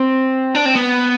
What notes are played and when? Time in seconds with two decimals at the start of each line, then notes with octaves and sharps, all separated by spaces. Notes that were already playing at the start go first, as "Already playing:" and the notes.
Already playing: C4
0.55 D4
0.66 C4
0.75 B3